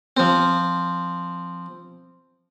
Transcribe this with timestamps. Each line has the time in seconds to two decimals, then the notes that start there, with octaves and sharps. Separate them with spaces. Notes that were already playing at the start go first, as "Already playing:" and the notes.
0.17 F3 C4